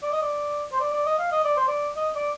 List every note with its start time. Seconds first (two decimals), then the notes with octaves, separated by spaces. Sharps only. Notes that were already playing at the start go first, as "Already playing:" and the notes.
0.02 D5
0.12 D#5
0.22 D5
0.72 C5
0.80 D5
0.93 D5
1.06 D#5
1.19 F5
1.32 D#5
1.44 D5
1.57 C5
1.68 D5
1.96 D#5
2.16 D5